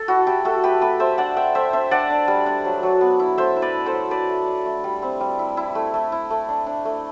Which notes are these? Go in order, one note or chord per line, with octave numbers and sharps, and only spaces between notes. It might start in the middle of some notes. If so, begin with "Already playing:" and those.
Already playing: A4
E4 F#4
E4 G4
A3 F#4 A4
A3 G4 B4
A3 G4 B4
A3 C5 E5
D4 D5 F#5
D4 E5 G5
A3 C5 E5
D4 C5 E5
D4 D5 F#5
D4
G3
D4
F#3
F#3
B3
E4
A3 C5 E5
E4
B4 D5
E4
A4 C5
F#3
D4 B4 D5
A3
D4
A3
G3
C4
G3
E4
E4
A3
A3
E4
A3
D4
D4
A3